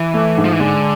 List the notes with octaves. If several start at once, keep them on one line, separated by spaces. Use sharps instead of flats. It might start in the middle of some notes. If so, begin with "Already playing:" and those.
Already playing: E3
A3
G#2
F3
E3
D3 G#3